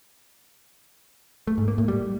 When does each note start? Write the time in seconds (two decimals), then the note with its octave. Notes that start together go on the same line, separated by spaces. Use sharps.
1.47 A3
1.58 G#2
1.68 A#3
1.78 A2
1.88 G3